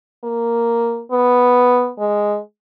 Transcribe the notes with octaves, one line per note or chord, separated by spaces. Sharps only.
A#3
B3
G#3